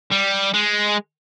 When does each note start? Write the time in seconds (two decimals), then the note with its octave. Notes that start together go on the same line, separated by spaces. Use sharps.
0.12 G3
0.54 G#3